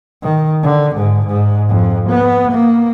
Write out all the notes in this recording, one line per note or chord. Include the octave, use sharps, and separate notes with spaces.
D#3
D3
G#2
G#2
F2
B3
A#3